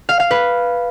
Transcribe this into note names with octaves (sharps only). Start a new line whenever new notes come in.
F5
F5
B4